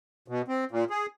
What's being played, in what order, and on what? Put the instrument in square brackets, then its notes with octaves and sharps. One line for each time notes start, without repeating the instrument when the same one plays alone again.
[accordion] B2
C4
A#2
G#4